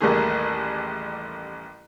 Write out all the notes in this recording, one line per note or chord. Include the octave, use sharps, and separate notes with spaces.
A1 D#2 G3 A3 A#3 G#4